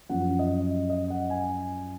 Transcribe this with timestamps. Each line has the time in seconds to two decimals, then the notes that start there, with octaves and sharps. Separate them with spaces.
0.09 F#2 F3 F#5
0.39 D#5
0.90 D#5
1.10 F#5
1.30 G#5